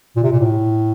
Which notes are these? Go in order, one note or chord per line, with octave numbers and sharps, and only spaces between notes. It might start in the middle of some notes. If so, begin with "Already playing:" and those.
A#2
C3
A#2
A2